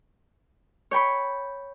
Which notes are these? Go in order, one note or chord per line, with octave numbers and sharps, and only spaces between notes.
C#5 G5 B5 C#6